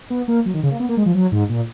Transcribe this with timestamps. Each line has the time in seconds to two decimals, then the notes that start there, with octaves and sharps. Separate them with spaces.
0.10 B3
0.28 A#3
0.46 F#3
0.54 D#3
0.63 C#3
0.71 A#3
0.80 B3
0.89 A#3
0.97 G#3
1.06 F3
1.14 F#3
1.32 G#2
1.49 A#2